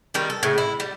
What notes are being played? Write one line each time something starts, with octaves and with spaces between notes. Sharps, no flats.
D#3 G3 A#4 B4
A4
A2 C#3
E4
G3